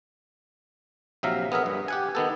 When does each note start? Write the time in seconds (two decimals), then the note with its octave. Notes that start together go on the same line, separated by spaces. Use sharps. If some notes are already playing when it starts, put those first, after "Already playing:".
1.23 A#1 C3 F#3 E5 F5 A#5
1.52 B3 G#4 A#4 E5
1.66 G2
1.88 G4 F#5 G#5
2.15 D#3 B3 A4